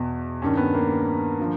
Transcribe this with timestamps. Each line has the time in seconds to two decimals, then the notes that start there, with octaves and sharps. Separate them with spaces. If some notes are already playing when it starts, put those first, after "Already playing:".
Already playing: E2 B2
0.42 G2 D#3 C#4
0.57 B3
0.74 A#3
1.40 D3 F3